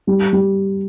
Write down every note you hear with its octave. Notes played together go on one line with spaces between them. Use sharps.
G3
G3